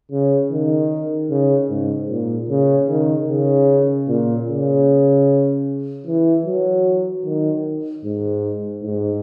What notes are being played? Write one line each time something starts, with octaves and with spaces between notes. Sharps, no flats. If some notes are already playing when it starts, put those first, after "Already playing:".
C#3
D#3
C#3
G#2
A#2
C#3
D#3
C#3
A#2
C#3
E3
F#3
D#3
G#2
G#2